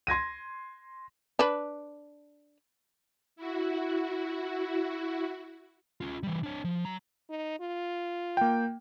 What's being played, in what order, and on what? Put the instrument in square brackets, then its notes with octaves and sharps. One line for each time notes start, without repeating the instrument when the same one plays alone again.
[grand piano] C6 G#6 A#6 D#7
[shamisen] D4 B4
[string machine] E4 F#4
[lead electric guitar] C#4 F4
E3 G3
D4 C#5
F3
F#3 A#5
[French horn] D#4
F4
[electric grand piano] A#3 G5